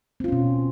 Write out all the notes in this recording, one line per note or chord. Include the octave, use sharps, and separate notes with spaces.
B2 C4 C#4 F4